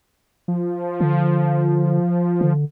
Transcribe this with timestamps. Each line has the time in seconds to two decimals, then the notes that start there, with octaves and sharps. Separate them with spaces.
0.48 F3
1.01 D3
2.41 D3